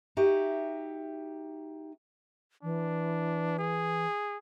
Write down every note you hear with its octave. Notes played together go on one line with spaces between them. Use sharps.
D#4 F#4 G4 E5
E3 D4
G#4